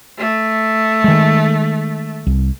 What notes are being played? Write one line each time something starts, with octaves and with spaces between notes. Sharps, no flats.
A3
D#3 G#3
C2